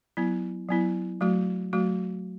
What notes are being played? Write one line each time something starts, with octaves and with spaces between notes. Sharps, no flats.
F#3 B3 E4
F#3 B3 E4
F#3 A3 F#4
F#3 A3 F#4